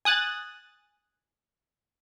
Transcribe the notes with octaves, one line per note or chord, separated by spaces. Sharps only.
G#5 D#6 F#6 A6